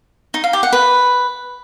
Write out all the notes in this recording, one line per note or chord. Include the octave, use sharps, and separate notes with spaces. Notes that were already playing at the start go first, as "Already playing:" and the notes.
D#4
F5
G4
F#5
B4